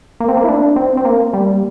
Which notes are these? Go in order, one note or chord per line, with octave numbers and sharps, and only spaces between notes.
A#3
C4
A#3
E4
D4
C4
C4
A#3
G3